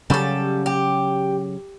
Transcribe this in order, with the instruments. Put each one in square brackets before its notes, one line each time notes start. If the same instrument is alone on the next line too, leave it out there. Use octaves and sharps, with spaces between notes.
[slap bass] C#3 F#3 C#4 [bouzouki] G3 A4
[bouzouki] G4